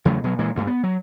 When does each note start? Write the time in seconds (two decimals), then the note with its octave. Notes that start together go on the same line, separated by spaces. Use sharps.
0.05 E2 C#3 F#3 A3
0.24 B2 F#3
0.39 A#2 E3 G#3
0.55 D2 G2 A3
0.67 B3
0.83 F#3